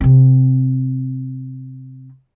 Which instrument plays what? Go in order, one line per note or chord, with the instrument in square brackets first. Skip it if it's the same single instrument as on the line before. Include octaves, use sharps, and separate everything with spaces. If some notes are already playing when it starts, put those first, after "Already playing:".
[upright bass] C3 C4